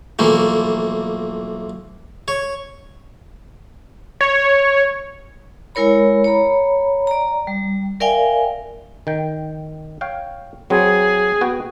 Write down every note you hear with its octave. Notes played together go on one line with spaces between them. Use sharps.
B1 E3 F3 A3 A#3
C#5
C#5
G#3 E4 A#4 C#5 B5
C#5 A#5 B5
D5 A#5
G3
A#4 D5 E5 F5 G5 G#5
D#3 G5
C#5 F5 G5
F#3 C4 G#4 B4
B3 F#4 G5